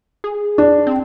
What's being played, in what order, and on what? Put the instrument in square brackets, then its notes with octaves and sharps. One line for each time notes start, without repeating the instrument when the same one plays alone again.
[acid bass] G#4
[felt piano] D4
[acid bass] C4